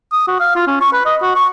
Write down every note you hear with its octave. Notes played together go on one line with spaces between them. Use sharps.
D#6
F#4
F5
F4
C#4
C#6
B4
D#5
F#4
C#6